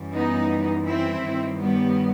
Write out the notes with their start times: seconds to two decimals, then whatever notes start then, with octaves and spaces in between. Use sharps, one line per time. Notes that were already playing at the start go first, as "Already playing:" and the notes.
Already playing: F#2 E3 G3
0.13 B3 D#4
0.86 C4 E4
1.23 G2 D#3 F#3
1.60 G3 B3